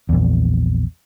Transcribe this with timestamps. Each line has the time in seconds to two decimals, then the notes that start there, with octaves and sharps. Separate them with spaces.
0.09 A#1 E2